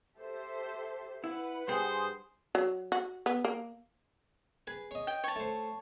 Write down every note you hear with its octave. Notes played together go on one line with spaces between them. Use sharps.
G4 A4 C5 E5
E4 B4 F#5
G2 G#4 C5 G5 G#5 C6 D#6
F#3
F#4
B3
A#3
G#4 B4
C#5 D#5
G5
C#5 A5
A3 C5